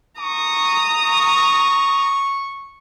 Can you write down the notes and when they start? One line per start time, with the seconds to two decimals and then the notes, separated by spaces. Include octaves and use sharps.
0.21 A#5 C#6 D#6
1.00 C#6